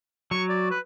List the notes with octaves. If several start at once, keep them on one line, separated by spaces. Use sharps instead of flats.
F#3 C#6
D5
B4